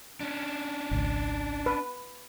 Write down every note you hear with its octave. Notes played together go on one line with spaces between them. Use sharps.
C#4 D4
G#1 C#2
B4